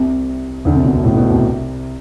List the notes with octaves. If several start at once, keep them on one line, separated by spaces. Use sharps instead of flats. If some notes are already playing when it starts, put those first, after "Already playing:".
Already playing: C2 C3
D2 D3
C2 C3
B2
C2 C3
A2
C3
B2
C2 C3